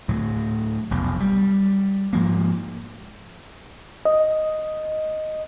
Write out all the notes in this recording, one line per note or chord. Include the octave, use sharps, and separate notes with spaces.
D2 A2 F#3
F1 B1 F2
G3
G#2 F3 A#3
D#5